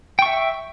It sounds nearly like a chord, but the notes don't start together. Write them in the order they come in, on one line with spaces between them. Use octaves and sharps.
G5 C#6 E5